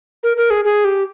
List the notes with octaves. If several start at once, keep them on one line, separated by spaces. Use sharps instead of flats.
A#4
A#4
G#4
G#4
G4